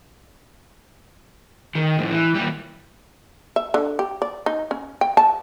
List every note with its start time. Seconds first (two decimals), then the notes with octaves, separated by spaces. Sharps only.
1.75 D#3
1.98 F2 A2
2.11 E3
2.35 D#2 G3
3.56 E5
3.74 D3
3.99 G4
4.22 D5
4.46 D#4
4.71 C#4
5.01 G5
5.17 A5